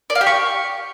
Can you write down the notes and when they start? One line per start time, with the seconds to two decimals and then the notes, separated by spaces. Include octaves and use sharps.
0.10 D5
0.15 F5
0.21 G4
0.26 C#6